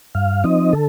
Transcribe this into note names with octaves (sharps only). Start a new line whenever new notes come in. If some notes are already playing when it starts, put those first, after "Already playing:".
G2 F5
F3 C4 D#4 D#5
D3 A4